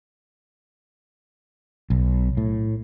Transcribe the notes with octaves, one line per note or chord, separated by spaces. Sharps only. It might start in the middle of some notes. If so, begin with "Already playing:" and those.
B1
A2